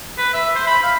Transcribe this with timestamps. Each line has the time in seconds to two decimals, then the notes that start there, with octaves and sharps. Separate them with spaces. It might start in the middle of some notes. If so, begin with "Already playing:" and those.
0.18 B4
0.34 E5
0.55 C5
0.67 B5
0.83 F5